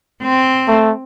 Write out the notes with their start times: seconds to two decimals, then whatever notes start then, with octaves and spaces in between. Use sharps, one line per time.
0.22 C4
0.68 A3